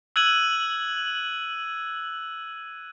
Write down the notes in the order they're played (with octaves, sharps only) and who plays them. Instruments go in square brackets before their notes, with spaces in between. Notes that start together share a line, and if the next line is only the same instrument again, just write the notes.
[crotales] E6 F#6 G#6 D#7 F#7